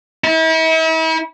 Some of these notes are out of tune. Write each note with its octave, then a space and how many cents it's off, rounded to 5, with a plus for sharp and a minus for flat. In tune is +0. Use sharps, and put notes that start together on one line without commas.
E4 -40